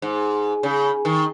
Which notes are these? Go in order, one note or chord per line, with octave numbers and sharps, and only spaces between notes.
G#2
C#3
D#3